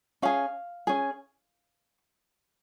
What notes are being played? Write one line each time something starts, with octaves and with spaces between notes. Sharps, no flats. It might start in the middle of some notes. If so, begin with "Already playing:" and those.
C#4 G#4 F5
C#4 G#4